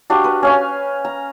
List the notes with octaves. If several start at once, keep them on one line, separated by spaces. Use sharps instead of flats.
D4 F#4 G4 F5
B4
C#4 F5 G#5
A#5